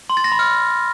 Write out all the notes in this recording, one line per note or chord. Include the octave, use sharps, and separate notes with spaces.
C6
A6
A#6
B5
F6